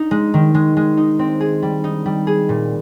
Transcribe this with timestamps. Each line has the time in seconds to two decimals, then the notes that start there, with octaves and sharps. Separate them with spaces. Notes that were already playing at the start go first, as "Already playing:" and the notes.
Already playing: D#4
0.11 G#3
0.34 D#3
0.54 G#3
0.77 G#3
0.97 D#4
1.19 C4
1.40 G#4
1.62 G3
1.84 D#4
2.06 G3
2.27 G#4
2.49 A#2